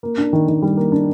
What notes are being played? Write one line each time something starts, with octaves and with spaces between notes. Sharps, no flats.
A#3
D4
D#3
D#3
G3
A#3
D4